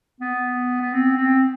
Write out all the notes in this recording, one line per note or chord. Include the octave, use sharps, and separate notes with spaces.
B3
B3
C4
C4